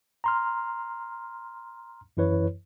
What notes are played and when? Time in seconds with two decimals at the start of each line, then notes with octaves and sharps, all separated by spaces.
0.24 A#5 C6 F6
2.17 F#2 E3 E4 B4 C#5